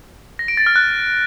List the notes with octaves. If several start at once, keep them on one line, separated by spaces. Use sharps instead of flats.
A#6
D7
A6
F6
F#6